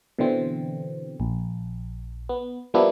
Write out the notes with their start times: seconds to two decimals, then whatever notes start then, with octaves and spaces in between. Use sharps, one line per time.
0.19 B2 D3 E3 C4
1.20 A#1
2.29 B3
2.74 F3 G3 A#3 B3 D4 E4